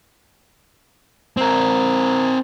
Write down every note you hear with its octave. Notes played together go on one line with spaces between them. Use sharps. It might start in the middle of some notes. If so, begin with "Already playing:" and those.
C4 A#4